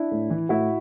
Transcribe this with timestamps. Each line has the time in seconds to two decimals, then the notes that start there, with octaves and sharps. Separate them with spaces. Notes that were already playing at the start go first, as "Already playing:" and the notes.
Already playing: D4 E4
0.11 A2
0.30 E3
0.49 A2 E4 F#4